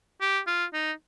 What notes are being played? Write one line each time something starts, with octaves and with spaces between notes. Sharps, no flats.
G4
F4
D#4